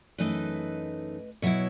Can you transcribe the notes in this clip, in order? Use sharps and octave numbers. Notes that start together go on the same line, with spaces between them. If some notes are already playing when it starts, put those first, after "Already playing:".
F#2 E3 A3 D#4 B4 D#5
B2 F#3 B3 E4 C#5 E5